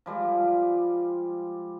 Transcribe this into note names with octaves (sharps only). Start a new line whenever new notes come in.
F3 G3 G#3 D5